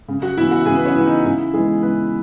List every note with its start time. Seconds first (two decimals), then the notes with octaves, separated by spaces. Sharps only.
0.08 C#3
0.22 F#4 F#5
0.37 E3 B3 E4 E5
0.51 F#4 F#5
0.66 C#3 G#4 G#5
0.77 B4
0.85 C#4 C#5
0.96 E3 B3
1.06 D#4
1.24 C#3 E4
1.53 E3 G#3 B3 G#4
1.83 C#3 B3 B4